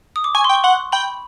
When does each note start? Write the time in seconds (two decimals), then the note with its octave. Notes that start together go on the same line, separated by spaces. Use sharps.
0.16 D#6
0.24 D6
0.35 G#5 C#6
0.44 C6
0.49 G5
0.54 C#6
0.64 F#5 C6
0.92 G5 B5